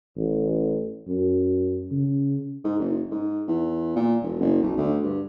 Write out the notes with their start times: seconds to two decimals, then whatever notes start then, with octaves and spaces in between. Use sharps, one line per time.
0.17 A1
1.08 F#2
1.91 C#3
2.64 G#2
2.79 F#1
3.11 G#2
3.47 E2
3.96 A#2
4.22 E1
4.40 F#1
4.63 B1
4.77 D2
5.03 G2